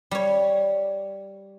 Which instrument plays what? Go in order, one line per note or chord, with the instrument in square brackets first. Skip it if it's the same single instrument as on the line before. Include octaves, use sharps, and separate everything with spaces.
[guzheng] G3 C#5